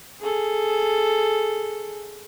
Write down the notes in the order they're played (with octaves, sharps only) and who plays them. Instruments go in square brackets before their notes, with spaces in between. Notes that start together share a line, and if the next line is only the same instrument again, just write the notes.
[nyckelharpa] G#4 A4